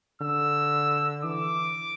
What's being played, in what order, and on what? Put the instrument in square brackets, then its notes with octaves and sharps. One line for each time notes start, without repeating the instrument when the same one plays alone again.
[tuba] D3 [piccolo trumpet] E6
[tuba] E3 [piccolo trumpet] D6